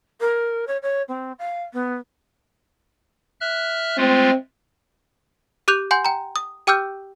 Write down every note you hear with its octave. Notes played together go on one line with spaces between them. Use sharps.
A#4
C#5
C#5
C4
F5
B3
E5 F6 F#6
G#3 A3 C4 F4
G4 D6 F#6 G6 F7
F#5 G#5 C6 G6
G5 A#5
D#6
G4 G5 D6 E6 F6 G6